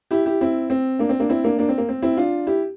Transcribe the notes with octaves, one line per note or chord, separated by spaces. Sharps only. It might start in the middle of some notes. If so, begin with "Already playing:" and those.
E4 G4
E4 G4
C4 E4
C4
A#3 D4
C4
A#3 D4
C4 E4
A#3 D4
A#3 D4
C4
A#3
C4
C4 E4
D4 F4
E4 G4